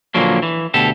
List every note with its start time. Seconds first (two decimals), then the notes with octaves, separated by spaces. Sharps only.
0.14 A#2 D3 F3 F#3 A#3
0.43 E3
0.74 D2 B2 G4 A4